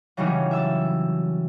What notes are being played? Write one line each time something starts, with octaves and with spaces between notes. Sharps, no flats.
C#3 E3 F#3 G3 C#4 D#4
E5 E6 A6